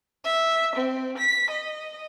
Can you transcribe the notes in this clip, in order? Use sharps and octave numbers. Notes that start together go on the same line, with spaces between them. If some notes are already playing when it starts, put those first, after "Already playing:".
E5
C4
B6
D#5